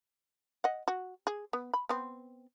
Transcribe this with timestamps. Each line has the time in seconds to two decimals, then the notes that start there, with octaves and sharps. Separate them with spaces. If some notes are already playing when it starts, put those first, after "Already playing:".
0.64 D#5 F#5
0.88 F#4
1.27 G#4
1.53 B3
1.74 B5
1.89 B3 C4